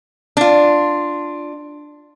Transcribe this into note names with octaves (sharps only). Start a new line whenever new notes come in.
D4 F4